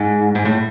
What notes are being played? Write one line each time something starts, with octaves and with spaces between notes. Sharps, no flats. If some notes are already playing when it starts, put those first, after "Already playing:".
Already playing: G#2
G#2
A2